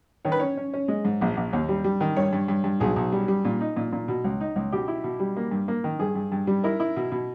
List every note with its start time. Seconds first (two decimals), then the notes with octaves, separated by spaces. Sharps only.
0.25 D#3 C#5
0.32 B4
0.40 C#4 C#5
0.57 C#4
0.73 C#4
0.88 G#3
1.05 G#2
1.21 A#1
1.37 A#1
1.53 D#2
1.69 G3
1.84 G3
2.01 D#3
2.16 G2 C#5
2.33 G2
2.48 G2
2.64 G2
2.80 B1 G#4
2.96 B1
3.12 G3
3.28 G3
3.45 A#2
3.61 D#4
3.76 A#2
3.93 A#2
4.08 B2
4.24 C#2
4.41 D#4
4.56 C#2
4.72 B2 G4
4.88 E4
5.04 B2
5.20 G3
5.36 A#3
5.51 G2
5.68 A#3
5.84 D#3
5.99 G2 G#4
6.15 G2
6.32 G2
6.47 G3
6.64 E4 A#4
6.80 E4
6.96 B2
7.12 B2